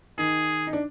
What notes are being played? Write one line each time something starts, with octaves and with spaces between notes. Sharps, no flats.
D#3 D#4 G#4
D#4
D4